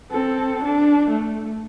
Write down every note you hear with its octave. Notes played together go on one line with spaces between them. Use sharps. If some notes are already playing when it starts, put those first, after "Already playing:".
C4 A4
D4
A3